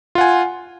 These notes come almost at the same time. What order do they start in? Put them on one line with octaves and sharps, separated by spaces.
F4 F#5 G#5